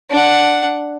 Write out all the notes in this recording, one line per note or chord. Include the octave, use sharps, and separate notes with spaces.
D4 F#5